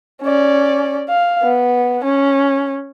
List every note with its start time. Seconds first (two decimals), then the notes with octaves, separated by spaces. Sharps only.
0.22 C#4 D5
1.09 F5
1.43 B3
2.04 C#4